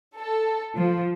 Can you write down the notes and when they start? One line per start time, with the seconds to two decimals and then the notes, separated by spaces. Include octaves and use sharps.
0.17 A4
0.75 F3